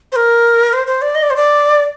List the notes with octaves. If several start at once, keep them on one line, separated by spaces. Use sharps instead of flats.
C5
A#4
C5
C5
D5
D#5
D5
C5
D5